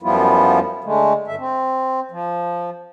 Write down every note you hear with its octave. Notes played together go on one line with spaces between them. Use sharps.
F#2 F3 G3 B3 E4 F4
D3 G#3 A3
G2 D3 E5
C4
F3